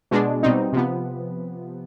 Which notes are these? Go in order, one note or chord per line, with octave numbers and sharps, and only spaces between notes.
B2 G#3 D4
B2 G3 C4 D#4
C3 F3 B3